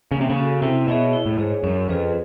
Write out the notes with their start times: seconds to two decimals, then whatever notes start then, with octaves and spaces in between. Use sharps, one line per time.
0.11 C#3 A#3
0.21 C3
0.30 C#3
0.36 C#4 F#4 A4
0.62 C3 E4
0.88 B2 G#4 C#5 E5
1.13 E4
1.26 A2
1.38 G#2 G#4 C#5
1.63 F#2 C#4
1.89 F2 F4 G#4 B4